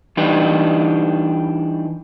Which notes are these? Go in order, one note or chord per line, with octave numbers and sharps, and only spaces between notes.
E3 G3 D4 D#4 B4